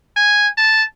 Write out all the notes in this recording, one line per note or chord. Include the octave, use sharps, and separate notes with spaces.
G#5
A5